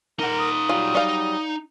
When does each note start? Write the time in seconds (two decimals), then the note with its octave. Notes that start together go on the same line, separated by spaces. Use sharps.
0.20 D#4 A#4 F#5
0.39 D#6
0.69 F#3 G3 F4
0.95 D#4 D5 F5